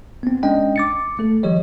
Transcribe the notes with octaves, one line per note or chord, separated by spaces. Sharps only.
B3 C4
G#3 C#4 D4 D#5 G5
D6 A6 C#7
A3 A4
D#3 F3 G3 G4 C#5 D#5